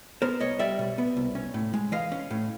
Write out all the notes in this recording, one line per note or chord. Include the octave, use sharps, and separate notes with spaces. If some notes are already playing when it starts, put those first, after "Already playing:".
B3 A#4 C5
C2 C#5 D#5
G3 D5 E5
B2
B3
C2
C#4
A2
G#3
E3 D#5 F5
C#4
A2